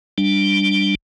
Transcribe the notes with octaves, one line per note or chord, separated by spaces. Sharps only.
G3 D4